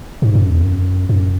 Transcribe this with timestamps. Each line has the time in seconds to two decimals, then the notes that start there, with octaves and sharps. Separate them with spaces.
0.22 G#2
0.35 F#2
0.50 E2
0.63 F#2
1.09 F#2